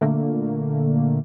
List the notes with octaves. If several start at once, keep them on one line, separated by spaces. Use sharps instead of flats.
A#2 D3 A3 A#3